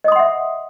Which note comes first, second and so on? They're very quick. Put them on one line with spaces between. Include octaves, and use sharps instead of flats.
D#5 D#6 C6 F#5 E5